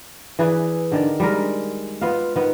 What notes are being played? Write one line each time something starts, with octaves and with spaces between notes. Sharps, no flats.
E3 G#4 B4 D5
D3 D#3 D5
G3 G#3 G4 A#4
B3 F4 D#5 F5
D#3 B3